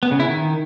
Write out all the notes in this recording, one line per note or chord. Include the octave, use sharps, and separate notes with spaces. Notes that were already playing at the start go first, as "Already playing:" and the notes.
B3
C#3
E4
D#3